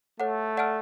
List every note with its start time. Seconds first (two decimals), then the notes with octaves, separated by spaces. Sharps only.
0.19 A3 A4 C#5 F#5
0.57 D5 F#5 A5 F6